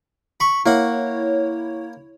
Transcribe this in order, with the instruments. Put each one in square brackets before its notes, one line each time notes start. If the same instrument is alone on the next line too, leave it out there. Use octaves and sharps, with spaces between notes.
[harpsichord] B5 C#6
[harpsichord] A#3 F#5 [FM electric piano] E4 C#5